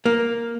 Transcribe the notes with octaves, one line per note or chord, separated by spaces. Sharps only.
A#3